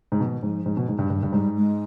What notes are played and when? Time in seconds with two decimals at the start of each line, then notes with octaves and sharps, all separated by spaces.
0.12 G#2
0.20 B2 F3
0.31 D#3
0.41 G#2 F3
0.66 G#2
0.77 B2
0.88 G#2
0.99 G2
1.10 G2 D#3
1.23 G2
1.33 G#2 G3
1.56 G#3